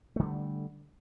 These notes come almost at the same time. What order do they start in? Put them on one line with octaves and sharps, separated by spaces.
A3 D3 G3